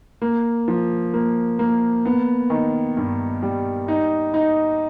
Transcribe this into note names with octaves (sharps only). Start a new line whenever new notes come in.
A#3
F3
A#3
A#3
B3
D#3
G2
G3
D#4
D#4